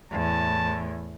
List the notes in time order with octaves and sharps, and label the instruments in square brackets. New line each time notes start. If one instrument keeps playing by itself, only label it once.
[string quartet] E2 A2 [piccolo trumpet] A5